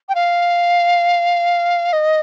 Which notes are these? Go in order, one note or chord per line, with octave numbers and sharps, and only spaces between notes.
G5
F5
D#5